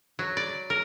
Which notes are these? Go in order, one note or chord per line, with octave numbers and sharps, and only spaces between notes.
F#3
D5
A#4